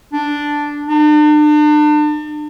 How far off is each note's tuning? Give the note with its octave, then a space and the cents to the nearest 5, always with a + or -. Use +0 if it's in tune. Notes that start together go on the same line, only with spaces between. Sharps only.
D4 +0
D4 +40